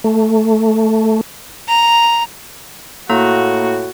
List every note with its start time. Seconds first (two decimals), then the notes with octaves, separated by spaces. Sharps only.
0.04 A3
1.69 A#5
3.10 A2 A#3 F#4 A#5